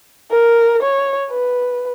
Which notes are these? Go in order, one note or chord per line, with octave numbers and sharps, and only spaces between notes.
A#4
C#5
B4